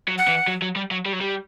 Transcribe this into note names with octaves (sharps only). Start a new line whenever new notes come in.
F#3
F#5
E3
F#3
F#3
G3
F#3
G3
F#3
G3